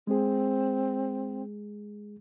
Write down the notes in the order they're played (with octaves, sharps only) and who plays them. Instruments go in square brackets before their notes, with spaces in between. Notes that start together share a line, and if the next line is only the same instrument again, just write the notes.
[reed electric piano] G#3 G#4 [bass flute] C4